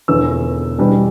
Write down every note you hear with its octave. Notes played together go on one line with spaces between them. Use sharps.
E1 E2 D3 F3 B3 E6
E2 B2 G3 D4